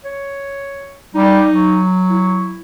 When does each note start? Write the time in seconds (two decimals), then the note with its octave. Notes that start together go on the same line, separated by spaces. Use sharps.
0.05 C#5
1.15 G3 D#4
1.51 F#3
2.10 E4